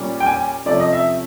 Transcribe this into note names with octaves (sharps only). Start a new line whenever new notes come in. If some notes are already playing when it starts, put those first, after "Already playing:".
Already playing: A#2 G3 A#3 C#4
G5
G#5
C3 F3 A3 C#4 D5
D#5
E5